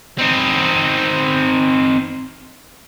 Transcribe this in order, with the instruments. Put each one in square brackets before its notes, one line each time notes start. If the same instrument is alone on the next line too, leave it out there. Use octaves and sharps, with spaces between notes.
[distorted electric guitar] C4 D#4